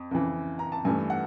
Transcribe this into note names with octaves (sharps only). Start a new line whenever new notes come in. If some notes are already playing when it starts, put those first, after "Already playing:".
Already playing: F2
F2 C#3 E3
A#5
A5
G2 E3 A3 G#5
F#5